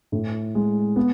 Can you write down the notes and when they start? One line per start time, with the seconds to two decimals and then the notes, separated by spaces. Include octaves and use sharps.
0.12 A2
0.55 G#3
0.96 B3